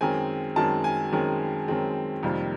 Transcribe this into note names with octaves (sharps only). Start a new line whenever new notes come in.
F#2 D#3 G#3 C4 G#5
F#2 D#3 G#3 C4 A5
G#5
F#2 D#3 G#3 C4
F#2 D#3 G#3 C4
F2 C3 D#3 G3 A#3